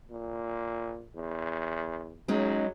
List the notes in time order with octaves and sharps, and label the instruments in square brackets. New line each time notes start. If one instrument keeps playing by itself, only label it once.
[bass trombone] A#2
E2
[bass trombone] F#3 [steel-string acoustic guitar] G#3 C#4 D#4